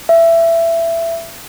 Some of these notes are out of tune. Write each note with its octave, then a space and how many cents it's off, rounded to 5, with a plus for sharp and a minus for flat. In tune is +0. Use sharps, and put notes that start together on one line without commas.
E5 +20